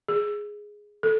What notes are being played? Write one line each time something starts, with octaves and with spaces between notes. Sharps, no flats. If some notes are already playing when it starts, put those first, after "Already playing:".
G#4
A4